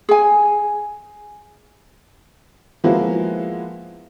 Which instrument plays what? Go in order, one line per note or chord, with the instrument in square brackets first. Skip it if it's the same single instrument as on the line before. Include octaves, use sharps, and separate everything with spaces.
[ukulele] G#4 G#5
[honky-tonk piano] F3 G#3 A#3 B3 E4 F#4